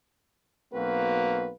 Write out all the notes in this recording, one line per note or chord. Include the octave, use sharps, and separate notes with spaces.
B1 A#3 C4 F#4 B4 F5